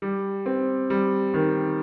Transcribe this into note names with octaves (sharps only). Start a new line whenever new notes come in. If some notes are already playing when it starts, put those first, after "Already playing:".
G3
C4
G3
D#3